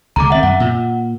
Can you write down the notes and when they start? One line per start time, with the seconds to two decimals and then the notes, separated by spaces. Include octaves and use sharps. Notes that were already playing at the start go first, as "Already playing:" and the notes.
0.16 C#2 D3 G#3 A#5 D6
0.30 D#3 C4 E5 F#5
0.43 F#2 F#5
0.60 A#2